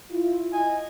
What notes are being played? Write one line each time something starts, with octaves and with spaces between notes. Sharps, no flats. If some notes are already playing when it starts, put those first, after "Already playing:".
E4 F4
D#5 G#5